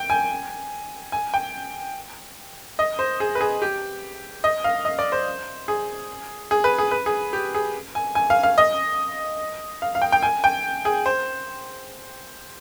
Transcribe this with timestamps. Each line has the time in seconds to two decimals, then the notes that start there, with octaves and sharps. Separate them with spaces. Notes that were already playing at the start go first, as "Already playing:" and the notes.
Already playing: G5
0.10 G#5
1.12 G#5
1.34 G5
2.79 D#5
2.99 C5
3.20 G#4
3.35 B4
3.41 G#4
3.62 G4
4.44 D#5
4.64 F5
4.85 D#5
4.99 D5
5.12 C5
5.68 G#4
6.51 G#4
6.64 B4
6.78 G#4
6.91 B4
7.06 G#4
7.33 G4
7.55 G#4
7.95 G#5
8.15 G#5
8.30 F5
8.43 F5
8.58 D#5
9.82 F5
9.95 F5
10.02 G5
10.12 G5
10.23 G#5
10.44 G5
10.85 G#4
11.06 C5